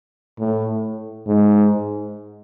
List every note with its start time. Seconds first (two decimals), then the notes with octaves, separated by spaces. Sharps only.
0.40 A2
1.27 G#2